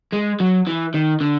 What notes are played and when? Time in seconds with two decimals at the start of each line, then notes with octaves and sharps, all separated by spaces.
0.12 G#3
0.40 F#3
0.67 E3
0.94 D#3
1.21 D3